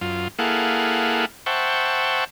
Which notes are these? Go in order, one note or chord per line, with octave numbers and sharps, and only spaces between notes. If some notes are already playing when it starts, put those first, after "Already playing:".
F#2 F4
A#3 E4 G#4 A4 F5 F#5
C5 E5 F#5 G5 A5 C#6